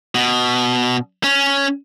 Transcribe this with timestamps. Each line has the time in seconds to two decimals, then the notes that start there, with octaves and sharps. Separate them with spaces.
0.15 B2
1.24 C#4